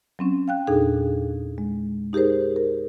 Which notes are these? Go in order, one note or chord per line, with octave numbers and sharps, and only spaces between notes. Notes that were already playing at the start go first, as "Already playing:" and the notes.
F#3 C4 C#4
F5 G5 F#6
E2 A#2 D4 D#4 G#4 A4
G#3
D#4 G4 G#4 A#4 C5
A#4